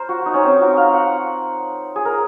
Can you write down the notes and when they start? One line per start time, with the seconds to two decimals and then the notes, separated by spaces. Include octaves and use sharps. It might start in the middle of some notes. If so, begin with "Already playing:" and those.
Already playing: A#4 C5
0.09 F#4
0.26 D#4
0.34 C#4
0.43 C4
0.51 D#4
0.60 F#4
0.77 F5
0.94 F#5
1.96 G#4
2.05 A#4